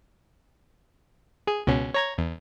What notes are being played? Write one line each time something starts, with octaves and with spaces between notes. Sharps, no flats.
G#4
C#2 B2 C#4
C#5 A#5 G#6
E2